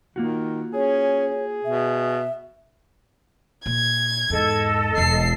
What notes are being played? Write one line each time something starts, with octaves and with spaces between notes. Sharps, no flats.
D#3 A#3 F4 F#4
C#4 G#4 C#5
B2 E5
A#2 G#6
E2 G#2 A4 D#5
E1 C#4 C7